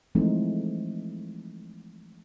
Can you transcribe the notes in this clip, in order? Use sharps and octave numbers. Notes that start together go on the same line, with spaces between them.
E3 F3 G#3 A3 C4 D#4